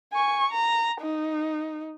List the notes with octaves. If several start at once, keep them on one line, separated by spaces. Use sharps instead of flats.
G#5 C#6
A#5
D#4